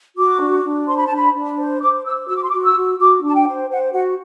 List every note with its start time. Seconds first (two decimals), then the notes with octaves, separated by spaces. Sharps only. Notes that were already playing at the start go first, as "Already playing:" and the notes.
0.16 F#4 D6
0.40 D4
0.63 D4
0.87 C5 C6
0.97 B5
1.06 D4 A5
1.16 B5
1.34 D4
1.58 C5
1.81 C5 D6
2.05 C5 E6
2.28 F#4 E6
2.35 D6
2.43 C6
2.49 F#4 D6
2.64 E6
2.76 F#4
2.99 F#4 D6
3.23 D4
3.28 A5
3.34 G5
3.46 C5
3.69 C5 F#5
3.93 F#4 F#5